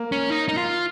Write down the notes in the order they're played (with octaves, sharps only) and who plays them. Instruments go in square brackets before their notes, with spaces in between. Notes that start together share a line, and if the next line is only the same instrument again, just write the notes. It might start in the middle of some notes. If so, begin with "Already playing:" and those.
Already playing: [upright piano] A#3
[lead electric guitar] C#4
D#4
D#4
F4